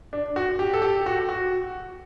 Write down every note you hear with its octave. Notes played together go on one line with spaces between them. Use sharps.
D4
F#4
G4
A4
G4
F#4
F#4